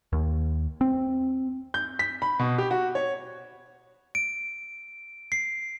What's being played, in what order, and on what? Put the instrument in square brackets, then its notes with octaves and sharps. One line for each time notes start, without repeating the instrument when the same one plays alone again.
[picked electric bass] D#2
C4
[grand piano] G6
B6
B5
B2
G4
F#4
C#5
[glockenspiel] D7
C7